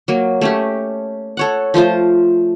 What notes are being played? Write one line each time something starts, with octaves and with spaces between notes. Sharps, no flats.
F#3 A#3
A3 C#4 G4
A4 C#5 F#5
F3 A3 F4 C5